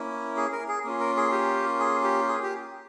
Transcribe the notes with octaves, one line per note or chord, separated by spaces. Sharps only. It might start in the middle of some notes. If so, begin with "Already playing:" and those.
Already playing: A#3 C#4 E4
G#4
A#4
G#4
A#3 C#4 F4
A#4
G#4
G4
G#4
G4
G#4
G4